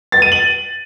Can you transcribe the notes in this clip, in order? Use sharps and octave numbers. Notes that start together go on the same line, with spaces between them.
A6
D#7
F#7